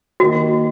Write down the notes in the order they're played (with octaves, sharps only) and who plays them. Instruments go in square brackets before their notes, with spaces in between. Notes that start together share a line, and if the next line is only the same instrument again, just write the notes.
[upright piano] D#3 A#3 [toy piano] F#4